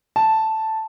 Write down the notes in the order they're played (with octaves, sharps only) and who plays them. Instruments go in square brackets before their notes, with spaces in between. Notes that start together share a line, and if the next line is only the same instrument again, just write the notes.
[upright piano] A5